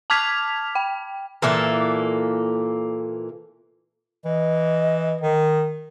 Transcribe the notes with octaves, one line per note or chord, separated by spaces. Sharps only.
A5 D6 F6 G#6 B6 F7
G5
A#2 E3 A#3 A4
E3 D#5
D#3